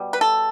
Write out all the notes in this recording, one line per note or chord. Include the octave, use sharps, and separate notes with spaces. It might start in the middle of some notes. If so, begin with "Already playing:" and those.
Already playing: B2 G3
B4
A4